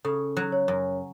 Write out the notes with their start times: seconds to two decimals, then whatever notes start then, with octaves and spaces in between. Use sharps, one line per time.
0.04 C#3 A4
0.37 F#3
0.52 C#5
0.68 F#2